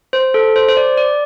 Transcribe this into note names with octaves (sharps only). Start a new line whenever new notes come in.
C5
A4
C5
C5
D5
D5